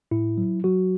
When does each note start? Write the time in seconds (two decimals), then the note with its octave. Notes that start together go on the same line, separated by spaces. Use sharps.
0.11 A2 E4
0.38 F#3
0.64 F#3 F#4